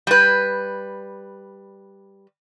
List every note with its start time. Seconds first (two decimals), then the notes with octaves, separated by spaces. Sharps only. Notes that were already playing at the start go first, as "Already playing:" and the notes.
0.07 G3 B4